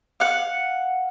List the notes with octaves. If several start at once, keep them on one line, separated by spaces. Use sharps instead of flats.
F5 F#5